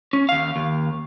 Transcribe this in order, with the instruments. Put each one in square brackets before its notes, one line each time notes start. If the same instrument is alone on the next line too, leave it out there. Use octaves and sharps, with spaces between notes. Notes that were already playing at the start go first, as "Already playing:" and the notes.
[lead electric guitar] C#4
D#2 F5
D#2